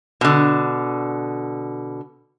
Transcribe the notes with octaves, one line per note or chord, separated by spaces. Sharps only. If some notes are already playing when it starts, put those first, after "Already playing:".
B2 D3